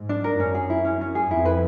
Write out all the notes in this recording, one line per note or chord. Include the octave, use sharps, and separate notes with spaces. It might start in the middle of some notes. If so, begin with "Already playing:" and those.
Already playing: G#2
D4
A#4
F#2 C#4
G#4
E4
C#4
C#4
G#4
F2 E4
B4